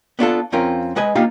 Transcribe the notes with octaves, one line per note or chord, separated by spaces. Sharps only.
B3 D4 F4 A4
F2 C4 C#4 F4 A#4
G#3 B4 D#5 G#5
A#3 D4 D#4 F4 G4